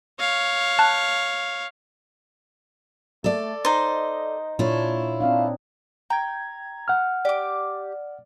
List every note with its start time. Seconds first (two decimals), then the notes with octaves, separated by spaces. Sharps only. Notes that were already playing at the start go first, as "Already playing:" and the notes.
0.20 C#5 F5
0.79 A5 F#6
3.24 A3 A4 D5
3.65 D#4 C5 D#5
4.59 A#2 D4 E4 F4 C#5
5.20 C4 D4 D#4 F5
6.10 G5 A#5 G#6
6.88 F#5 F6
7.25 G4 D5 D6